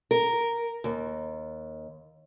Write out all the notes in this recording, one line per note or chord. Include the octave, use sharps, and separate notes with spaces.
A#4
D#2